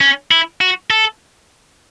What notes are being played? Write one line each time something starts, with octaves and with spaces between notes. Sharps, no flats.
C#4
E4
F#4
A4